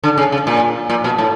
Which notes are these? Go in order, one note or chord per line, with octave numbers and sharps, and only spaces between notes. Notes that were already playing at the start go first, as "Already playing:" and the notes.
D3
C#3
C#3
A#2
A#2
B2
A2